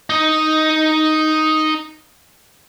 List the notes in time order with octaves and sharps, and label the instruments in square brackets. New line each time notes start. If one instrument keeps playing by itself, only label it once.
[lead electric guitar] D#4 D#5